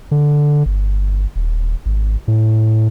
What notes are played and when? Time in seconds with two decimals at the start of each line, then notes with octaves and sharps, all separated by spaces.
0.11 D3
0.66 G1
1.36 D#1
1.86 G#1
2.28 A2